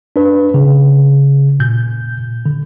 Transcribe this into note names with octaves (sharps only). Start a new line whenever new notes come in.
D4 B4
C#3
A#2 G6
D3